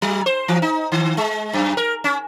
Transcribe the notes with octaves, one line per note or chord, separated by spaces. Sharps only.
F#3
C5
E3
D#4
D#3
G#3
F#2
A#4
C#4